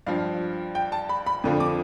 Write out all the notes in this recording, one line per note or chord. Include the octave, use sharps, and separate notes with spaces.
G2 F3 F5
G5
A5
B5
B5
F2 D3 F3
D6